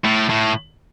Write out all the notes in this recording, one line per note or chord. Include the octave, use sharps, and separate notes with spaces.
A2
A2